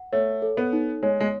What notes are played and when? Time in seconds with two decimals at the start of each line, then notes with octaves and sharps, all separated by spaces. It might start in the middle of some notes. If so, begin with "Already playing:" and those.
Already playing: F#5
0.12 A3 C#5
0.42 A4
0.57 B3
0.73 D#4
1.03 G#3 C#5
1.20 G#3